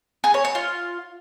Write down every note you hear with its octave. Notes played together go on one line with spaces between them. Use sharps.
G#4
C#5
C#5
F4